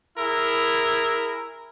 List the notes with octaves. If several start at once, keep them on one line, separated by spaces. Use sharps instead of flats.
E4 G#4 A#4